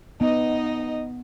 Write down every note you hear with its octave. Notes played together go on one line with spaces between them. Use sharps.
B3 D#4 D#5